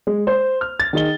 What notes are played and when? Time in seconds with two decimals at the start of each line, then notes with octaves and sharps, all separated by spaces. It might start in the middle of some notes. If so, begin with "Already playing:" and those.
0.07 G#3
0.27 C5
0.61 F6
0.80 A6
0.93 D#3 G#4 D#5 G7